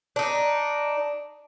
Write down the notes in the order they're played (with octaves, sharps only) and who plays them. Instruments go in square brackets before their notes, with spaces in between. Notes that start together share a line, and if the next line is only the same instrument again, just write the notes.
[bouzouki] D4 D#4